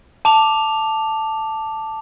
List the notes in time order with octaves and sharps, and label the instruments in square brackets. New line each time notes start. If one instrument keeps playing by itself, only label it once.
[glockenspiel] A5 D6 F7